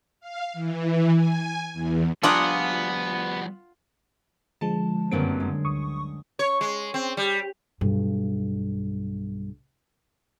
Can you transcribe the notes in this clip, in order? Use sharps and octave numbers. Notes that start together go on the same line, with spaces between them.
F5
E3
G#5
E2
F3 G3 B3 D4 F4 G#4 F#5 A#5
D3 F3 G#3 A5
G1 F#2 C#3 A#3 C4 D7
G#3
D2 C#6 D#6
C#5
G#3
C4
G3
B1 G2